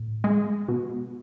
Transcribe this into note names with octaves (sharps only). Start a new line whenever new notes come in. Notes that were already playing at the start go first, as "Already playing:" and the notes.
Already playing: A2
G#3
B2